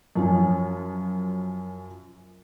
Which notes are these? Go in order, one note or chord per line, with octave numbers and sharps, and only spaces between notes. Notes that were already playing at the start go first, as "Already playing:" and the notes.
F#2 F3 C#4